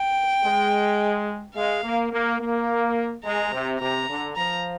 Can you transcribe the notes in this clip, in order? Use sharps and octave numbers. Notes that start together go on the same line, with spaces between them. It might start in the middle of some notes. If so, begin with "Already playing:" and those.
Already playing: G5
G#3
G#3 F5
A#3
A#3
A#3
G#3 A#5
C3
C3 A#5
D3
F3 A#5